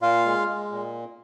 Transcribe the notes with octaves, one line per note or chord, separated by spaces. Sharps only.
A#2 F4 F5
G#3
G#3
A#2